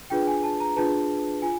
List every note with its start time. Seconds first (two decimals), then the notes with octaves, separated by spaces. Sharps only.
0.10 D4 F4 G#4 B4 G5
0.27 G#5
0.44 A5
0.60 A#5
0.76 D4 F4 G#4 B4 A5
1.42 F4 G#5